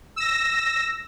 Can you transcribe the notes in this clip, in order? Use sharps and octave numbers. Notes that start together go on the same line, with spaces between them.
E6 A#6